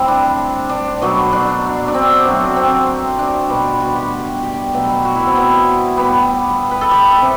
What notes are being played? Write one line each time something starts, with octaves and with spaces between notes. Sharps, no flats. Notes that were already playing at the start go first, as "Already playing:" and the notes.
Already playing: A2 G3 C4
D4
D4
B2 F#3 A3
D4
D4
C4
C3 F#3 A3
C4
D4
B2 G3
F#4
G4
G4
B2 F#3 A3
F#4
E4
C4
B3
A2 G3 B3
B4
A4
G4
C3